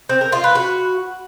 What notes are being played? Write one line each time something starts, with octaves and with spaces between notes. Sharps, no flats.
C4
A#4
F4
B4
F#4